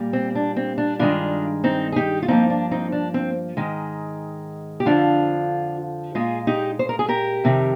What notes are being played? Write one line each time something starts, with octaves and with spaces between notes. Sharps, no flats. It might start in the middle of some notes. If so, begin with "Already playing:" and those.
Already playing: A#2 G3 A#3
C4
D4
C4
D4
G2 D#3 G#3 D4 F4
C4 D#4
G#4
D#4 G4
F4
G2 F3 A#3 C4 D#4
D4
C4 D#4
D4
C4
G#2 D#3 G#3
G4
F2 D3 F3 D4 F4
A#2 G#3 F4 G#4
D#4 G4
C5
A#4
G#4
G4 A#4
F2 C3 D#3